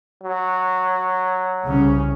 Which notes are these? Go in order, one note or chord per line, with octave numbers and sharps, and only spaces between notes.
F#3
C2 C#3 C#4